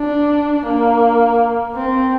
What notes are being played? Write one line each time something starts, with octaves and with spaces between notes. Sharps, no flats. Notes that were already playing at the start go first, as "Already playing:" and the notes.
Already playing: D4
A#3
C4